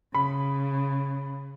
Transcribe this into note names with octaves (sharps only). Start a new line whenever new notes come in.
C#3 B5